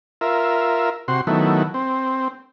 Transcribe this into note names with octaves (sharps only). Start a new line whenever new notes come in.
F4 A#4 E5
C3 F#4 C6
D#3 F#3 A3 B3 E4
C4